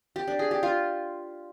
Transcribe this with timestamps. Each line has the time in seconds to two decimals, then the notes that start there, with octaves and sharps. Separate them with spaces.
0.16 G4
0.28 D4
0.39 G#4
0.51 G4
0.63 F4